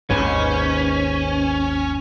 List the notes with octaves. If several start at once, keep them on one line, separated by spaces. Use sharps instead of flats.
G#1 D#2 G#2 C#4 B4 C#5